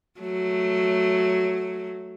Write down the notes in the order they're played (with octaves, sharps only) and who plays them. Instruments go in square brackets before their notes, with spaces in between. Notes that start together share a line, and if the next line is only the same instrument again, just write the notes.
[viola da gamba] F#3 A3